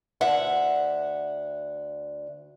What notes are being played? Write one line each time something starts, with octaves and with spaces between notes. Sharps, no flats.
D2 E5 F#5